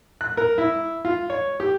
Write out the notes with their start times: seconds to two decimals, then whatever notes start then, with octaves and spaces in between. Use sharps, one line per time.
0.21 F#6
0.37 A#4
0.58 E4
1.05 F4
1.30 C#5
1.60 G4